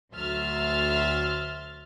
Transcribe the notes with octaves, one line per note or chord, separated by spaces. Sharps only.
D2 F#3 E5 C6 F6 A6